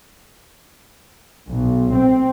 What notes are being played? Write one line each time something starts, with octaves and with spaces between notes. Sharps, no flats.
B1
C4